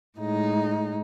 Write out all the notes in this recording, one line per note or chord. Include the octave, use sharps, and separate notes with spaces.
A2 G#3 D#4